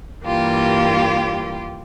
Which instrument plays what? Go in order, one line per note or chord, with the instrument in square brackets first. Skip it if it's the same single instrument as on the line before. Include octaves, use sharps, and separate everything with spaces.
[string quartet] G2 E3 G3 A#3 F4 G4